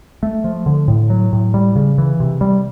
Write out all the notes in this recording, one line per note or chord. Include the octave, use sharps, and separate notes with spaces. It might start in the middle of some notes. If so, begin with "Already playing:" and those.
A3
F3
D3
A2
F#3
A2
G3
C#3
E3
C3
G3